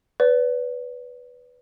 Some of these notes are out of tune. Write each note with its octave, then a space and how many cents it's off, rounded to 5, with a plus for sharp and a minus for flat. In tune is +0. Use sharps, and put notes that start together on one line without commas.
B4 +0 D5 -40